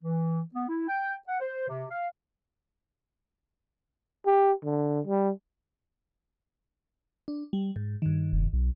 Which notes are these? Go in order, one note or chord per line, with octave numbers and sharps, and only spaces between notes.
E3
B3
E4
G5
F#5
C5
C3
F5
G4
D3
G3
D4
G3
G#2
G2 D#3
F1
B1